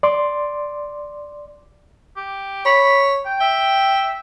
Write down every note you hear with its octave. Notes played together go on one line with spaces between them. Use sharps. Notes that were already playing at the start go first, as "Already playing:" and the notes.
D5 C6 D6
G4
C#5 B5
G5
E5 G5